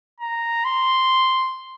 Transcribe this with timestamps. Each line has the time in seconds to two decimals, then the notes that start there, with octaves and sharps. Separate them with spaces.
0.20 A#5
0.65 C6